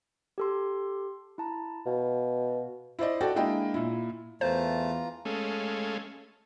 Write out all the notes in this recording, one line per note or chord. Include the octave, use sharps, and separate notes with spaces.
G4 A4 C6
E4 A5 A#5
B2 F5
E4 C5 D5 D#5
F#4 A4 D5 G5
G#3 A#3 D4 E4 D#5 G5
A#2 E4
E2 E3 A3 F4 C5 A5 A#5
G#3 A3 C#4 A4 F5 G#5